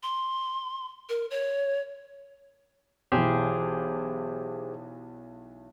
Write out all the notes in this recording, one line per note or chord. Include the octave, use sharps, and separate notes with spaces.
C6
A#4
C#5
B1 E3 G4 G#4 C5